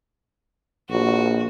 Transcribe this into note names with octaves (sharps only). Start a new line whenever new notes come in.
A#1 F#4